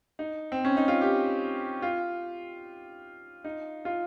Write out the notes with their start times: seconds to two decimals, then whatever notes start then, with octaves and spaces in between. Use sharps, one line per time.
0.19 D#4
0.52 C4
0.65 C#4
0.77 D#4
0.88 F4
1.01 G4
1.82 F4
3.44 D#4
3.85 F4